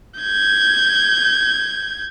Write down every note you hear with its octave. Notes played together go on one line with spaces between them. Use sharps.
G6 G#6